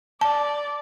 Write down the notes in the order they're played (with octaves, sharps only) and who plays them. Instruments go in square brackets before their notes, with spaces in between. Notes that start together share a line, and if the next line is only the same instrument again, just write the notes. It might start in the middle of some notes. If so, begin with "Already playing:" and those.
[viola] D5 [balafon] A5